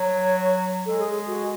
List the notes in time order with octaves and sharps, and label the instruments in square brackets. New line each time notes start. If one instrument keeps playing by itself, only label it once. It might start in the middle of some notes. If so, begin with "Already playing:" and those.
Already playing: [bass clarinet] F#3 [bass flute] C#5
[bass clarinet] G#3 [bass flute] A4
[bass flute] G#4
F#4